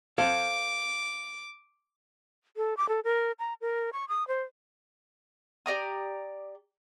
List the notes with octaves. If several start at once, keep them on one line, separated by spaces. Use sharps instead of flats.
A4 C5 F5 D6
A4
D6
A4
A#4
A#5
A#4
C#6
D#6
C5
G4 D5 A#5 D#6